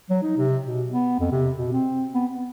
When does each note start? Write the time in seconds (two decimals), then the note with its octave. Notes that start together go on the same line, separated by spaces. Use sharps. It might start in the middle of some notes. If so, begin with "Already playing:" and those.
0.10 F#3
0.22 D#4
0.37 C3
0.65 B2
0.90 B3
1.20 F2
1.32 C3
1.57 B2
1.72 C4
2.13 B3
2.33 B3